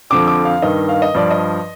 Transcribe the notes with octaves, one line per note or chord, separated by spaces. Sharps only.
F2 D3 F3 D6
D6
F5
G2 D#3 D#5
F5
D#5
G2 F3 D5
D#5